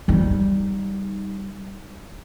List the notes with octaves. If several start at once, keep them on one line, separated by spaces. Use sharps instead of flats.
G3 D#4